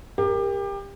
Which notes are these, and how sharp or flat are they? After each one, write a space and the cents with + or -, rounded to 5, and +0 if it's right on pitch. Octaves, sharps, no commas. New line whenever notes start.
G4 +25 A#4 +0